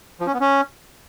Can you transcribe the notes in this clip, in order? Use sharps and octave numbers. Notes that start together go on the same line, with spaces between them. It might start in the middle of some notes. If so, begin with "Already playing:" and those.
F3
C#4
B3
C#4